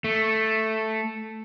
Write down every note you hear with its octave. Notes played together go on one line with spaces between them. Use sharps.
A3